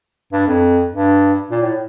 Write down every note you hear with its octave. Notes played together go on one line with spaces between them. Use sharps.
G2
F2
G2
A#2
A2